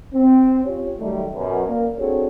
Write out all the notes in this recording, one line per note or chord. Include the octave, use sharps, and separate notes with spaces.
C4
C#4 F4 G4 C#5
D#3 F#3 G3 A3
F#2 B2
A#3 A#4 D5
C4 D4 F#4 G#4 A4 C#5